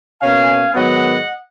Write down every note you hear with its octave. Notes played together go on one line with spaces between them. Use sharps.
B2 A#3 C#4 F5 G#5
G#2 D#3 F#3 B3 D#5 F#5